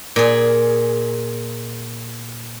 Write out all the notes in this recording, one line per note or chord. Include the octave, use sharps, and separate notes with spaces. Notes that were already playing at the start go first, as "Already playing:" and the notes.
A#2 G#4